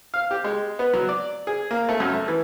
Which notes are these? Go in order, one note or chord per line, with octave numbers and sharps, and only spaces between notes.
F5
G4
G#3
B3
F#3
D5
G#4
A#3
A3
F#2
A3
E3